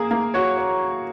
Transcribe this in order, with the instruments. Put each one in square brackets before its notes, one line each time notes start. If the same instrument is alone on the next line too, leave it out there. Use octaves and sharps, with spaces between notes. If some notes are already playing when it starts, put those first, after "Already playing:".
Already playing: [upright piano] A#3 [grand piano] G#4
[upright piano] A#3
[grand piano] F#4 [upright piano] C#5
[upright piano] C#5